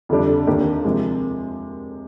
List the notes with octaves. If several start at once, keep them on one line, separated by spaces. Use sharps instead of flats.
F2 D3 G3 D4
D#2 D#3 A#3 D4 G4
C3 F3 G#3